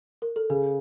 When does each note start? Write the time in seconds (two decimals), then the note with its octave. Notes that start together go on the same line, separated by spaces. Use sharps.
0.22 A#4
0.36 A4
0.50 C#3 G#4